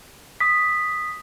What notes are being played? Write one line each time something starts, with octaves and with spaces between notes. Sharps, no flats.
D#6 B6